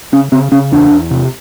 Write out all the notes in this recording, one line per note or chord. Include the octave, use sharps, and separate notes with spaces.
C#3 C#4
C#3 C4
C#3 C#4
E2 D4
E2
C3